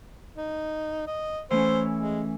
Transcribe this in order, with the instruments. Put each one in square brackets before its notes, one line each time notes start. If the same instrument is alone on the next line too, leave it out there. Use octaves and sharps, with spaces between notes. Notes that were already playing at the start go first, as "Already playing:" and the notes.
[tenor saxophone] D#4
D#5
[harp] E3 A3 C#4 [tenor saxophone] C5
[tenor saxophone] G#3